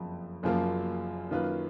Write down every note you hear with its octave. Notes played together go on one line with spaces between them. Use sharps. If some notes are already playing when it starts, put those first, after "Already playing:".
Already playing: F#1 F2 F3
F#1 F#2 F3 A#3 F4
F#2 D#3 A#3 F4 B4